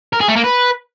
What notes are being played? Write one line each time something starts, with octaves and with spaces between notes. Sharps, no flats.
A#4
G#4
A3
A#3
B4